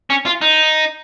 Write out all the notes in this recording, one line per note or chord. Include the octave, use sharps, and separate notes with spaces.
C#4
F4
D#4